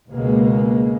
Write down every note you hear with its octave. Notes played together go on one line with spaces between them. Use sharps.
C#2 B2 G#3 A#3